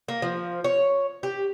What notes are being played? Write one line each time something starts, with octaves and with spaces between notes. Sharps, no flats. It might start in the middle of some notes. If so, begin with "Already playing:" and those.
A#3
F3
C#5
G4